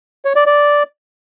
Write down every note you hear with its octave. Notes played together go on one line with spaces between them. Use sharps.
C#5
D5
D5